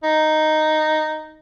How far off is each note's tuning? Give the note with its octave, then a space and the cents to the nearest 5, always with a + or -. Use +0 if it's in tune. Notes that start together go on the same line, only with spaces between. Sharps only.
D#4 -5